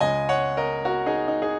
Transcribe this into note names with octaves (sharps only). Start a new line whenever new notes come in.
C#2 C#3 G#3 D#5 G#5
C#5 F#5
A#4 D#5
F#4 A#4
D#4 G#4
D#4
G#4